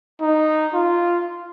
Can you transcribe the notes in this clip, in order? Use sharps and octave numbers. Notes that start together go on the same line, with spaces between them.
D#4
F4